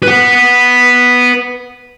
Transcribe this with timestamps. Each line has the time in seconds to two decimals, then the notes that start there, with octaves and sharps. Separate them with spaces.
0.03 B4 F#5